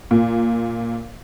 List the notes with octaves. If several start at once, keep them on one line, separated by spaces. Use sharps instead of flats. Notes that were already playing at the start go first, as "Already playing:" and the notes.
A#2